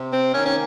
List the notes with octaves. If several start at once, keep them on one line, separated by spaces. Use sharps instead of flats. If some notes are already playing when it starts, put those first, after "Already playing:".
Already playing: C3
C4
D#3 A#3 C#4
C#4